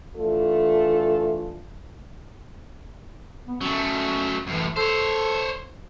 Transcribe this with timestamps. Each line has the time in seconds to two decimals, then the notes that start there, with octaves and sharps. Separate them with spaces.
0.16 E3 A3 D4 F4 A4
3.47 B3
3.61 F#3 A3 C#4
4.47 F#2 A2 E3
4.76 A4 C5 C#5